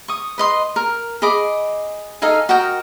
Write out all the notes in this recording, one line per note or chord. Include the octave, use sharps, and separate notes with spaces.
C#6 D#6
B4 D#5 C6 D#6
A#4
G#4 D#5 B5 D6
D#4 A4 F5 G#5
F#4 A#4 D#5 G5